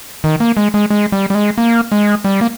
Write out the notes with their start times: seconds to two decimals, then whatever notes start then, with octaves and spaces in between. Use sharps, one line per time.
0.24 D#3
0.40 A#3
0.57 G#3
0.74 G#3
0.90 G#3
1.12 G3
1.30 G3
1.35 G#3
1.58 A#3
1.92 G#3
2.24 G3
2.41 A#3